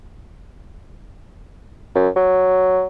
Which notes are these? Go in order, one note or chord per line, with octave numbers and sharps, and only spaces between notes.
F#2
F#3